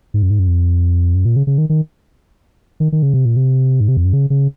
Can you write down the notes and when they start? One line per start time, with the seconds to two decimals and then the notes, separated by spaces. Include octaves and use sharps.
0.14 G#2
0.23 F#2
0.30 G#2
0.39 F#2
0.48 F2
1.15 F#2
1.25 A#2
1.36 C#3
1.47 C#3
1.58 D#3
1.69 D#3
2.80 D#3
2.92 D#3
3.03 C#3
3.14 C3
3.25 A#2
3.37 C3
3.80 G#2
3.88 C3
3.97 F2
4.05 F#2
4.13 C#3
4.30 C#3